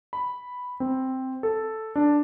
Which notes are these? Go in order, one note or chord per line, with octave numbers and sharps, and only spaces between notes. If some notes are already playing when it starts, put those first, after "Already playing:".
B5
C4
A4
D4